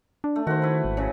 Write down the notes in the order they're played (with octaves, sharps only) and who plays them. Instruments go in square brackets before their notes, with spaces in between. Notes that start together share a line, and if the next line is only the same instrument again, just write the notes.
[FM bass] D4
[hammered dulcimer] A3
[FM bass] D#3 [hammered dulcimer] F#4 C5
[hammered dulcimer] E4 B4
[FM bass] G#1
[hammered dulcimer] C#3 F#3